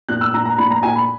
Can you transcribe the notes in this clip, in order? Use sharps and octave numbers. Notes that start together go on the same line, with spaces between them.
A#2 F#6
E6
A#2 A#5
A#5
A#2 B5
A#5
A#2 G#5
B5